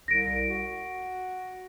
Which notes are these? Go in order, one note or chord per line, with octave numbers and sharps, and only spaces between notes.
C2 A#6 D7
F#4